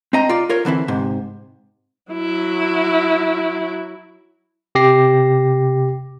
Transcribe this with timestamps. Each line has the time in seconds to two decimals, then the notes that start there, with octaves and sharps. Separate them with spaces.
0.13 C4 D#5 A#5
0.29 F4 D5
0.49 F4 A#4 C#5
0.65 D3 E3 C4 E4
0.88 G#2 C3
2.12 F#3 E4
4.75 C3 G4 A#6 C7